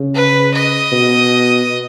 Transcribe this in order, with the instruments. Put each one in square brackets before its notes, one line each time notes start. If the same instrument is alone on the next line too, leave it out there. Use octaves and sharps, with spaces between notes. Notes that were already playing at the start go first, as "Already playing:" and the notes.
Already playing: [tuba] C#3
[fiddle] B4
D#5
[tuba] B2